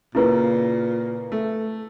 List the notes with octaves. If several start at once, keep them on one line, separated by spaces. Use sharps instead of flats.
A#2 C#3 A#3 E4 B4
A3